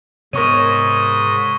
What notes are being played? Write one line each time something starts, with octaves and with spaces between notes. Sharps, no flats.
G#2 C3 B3 A#4 C#5 D#5 C#6 D#7